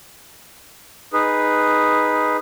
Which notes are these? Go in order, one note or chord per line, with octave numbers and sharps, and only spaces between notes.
D#4 G#4 B4